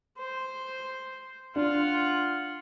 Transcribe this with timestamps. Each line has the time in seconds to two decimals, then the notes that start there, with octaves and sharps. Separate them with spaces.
0.18 C5
1.56 D4 F4 F#5